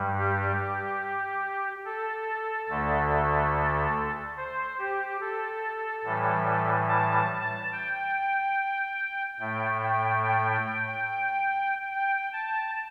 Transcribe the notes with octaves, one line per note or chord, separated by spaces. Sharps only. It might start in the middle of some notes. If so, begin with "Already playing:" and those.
Already playing: G2 G3
G4
A4
D2 D3 A3
C5
G4
A4
A2 E3 G3
A5
G5
A2 A3 G5
G5
G5
G5
A5